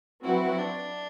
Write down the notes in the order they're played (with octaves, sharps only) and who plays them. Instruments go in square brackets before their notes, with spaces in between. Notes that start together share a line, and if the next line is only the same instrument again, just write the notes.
[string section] F#3 C4 F#4 B4 [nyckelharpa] E4
[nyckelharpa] D4